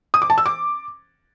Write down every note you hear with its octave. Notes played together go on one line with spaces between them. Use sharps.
D#6
D6
A5
E6
D6